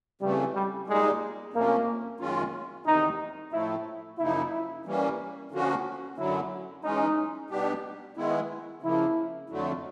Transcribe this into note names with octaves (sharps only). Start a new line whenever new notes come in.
F2 C#3 E3 G3 A3
G3
A#2 G3 G#3 A#3 D#4
F2 C3 F3 A3 A#3 C#4
F#2 D#3 G#3 C#4 F4
E2 C3 D#3 D#4
A2 F3 A3 E4
F#2 C#3 F3 A#3 D#4 E4
E3 G3 A#3 C#4
D3 F3 A#3 C#4 F#4
F#2 D3 F#3 E4
E3 G#3 C#4 D#4
B2 G3 B3 D4 G4
D#3 G#3 B3 E4
C#3 F3 A#3 E4
F2 D3 F#3 A3